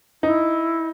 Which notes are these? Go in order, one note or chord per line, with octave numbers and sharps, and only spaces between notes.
D#4 E4